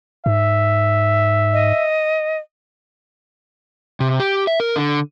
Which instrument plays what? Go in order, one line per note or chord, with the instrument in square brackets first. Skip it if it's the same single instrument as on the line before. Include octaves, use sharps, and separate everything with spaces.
[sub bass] G#2 [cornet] E5
[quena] D#5
[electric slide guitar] C3
G4
E5
A#4
D3